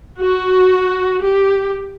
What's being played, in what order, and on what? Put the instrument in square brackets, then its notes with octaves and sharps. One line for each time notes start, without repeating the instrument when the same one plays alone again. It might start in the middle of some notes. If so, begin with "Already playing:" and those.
[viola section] F#4
G4